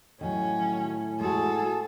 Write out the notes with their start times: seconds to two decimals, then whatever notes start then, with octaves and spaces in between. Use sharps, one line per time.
0.21 A2 D#3 F#3 C#4
1.20 G#3 F#4 G#4 A4